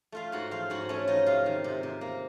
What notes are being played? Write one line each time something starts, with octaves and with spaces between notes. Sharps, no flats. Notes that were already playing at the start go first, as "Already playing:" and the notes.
A3 F4 F5
G#2 F#4 F#5
F3 F4 F5
G#2 F#4 F#5
A3 C#4 C#5
F3 D#4 D#5
C3 F4 F5
D#3
C3
C3
A#3